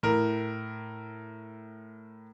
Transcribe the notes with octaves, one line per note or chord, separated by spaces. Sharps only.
A2 A#4